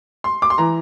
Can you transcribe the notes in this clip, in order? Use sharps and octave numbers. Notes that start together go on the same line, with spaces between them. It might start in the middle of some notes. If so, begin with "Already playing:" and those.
C6
D6
C6
E3 A#5